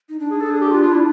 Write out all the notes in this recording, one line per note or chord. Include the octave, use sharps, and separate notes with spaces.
D#4
D4
G#4
A4
G#4
G4
F4
F4
E4